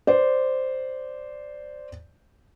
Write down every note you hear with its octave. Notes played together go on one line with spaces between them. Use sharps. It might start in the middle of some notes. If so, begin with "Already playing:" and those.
C5 D5